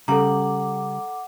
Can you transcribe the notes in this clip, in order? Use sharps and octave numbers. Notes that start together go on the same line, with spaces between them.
C#3 G3 A4 F#5 A#5 D6